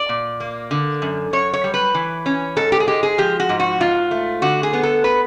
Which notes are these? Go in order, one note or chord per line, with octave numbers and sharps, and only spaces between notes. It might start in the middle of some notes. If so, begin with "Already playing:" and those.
Already playing: D5
A#2
A#3
D3
F#2
F#2 C#5
C#5
G3
B4
E3
C#4
G#2 A4
G4
G#4
G#3 G4
G#4
F3 G4
F#4
G#2
F#4
G#2 F4
A3
D3 F#4
G#4
B3
A4
B4